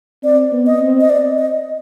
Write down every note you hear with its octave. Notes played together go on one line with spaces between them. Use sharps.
C4 D5
B3
D#5
C4
D#5
D5
D#5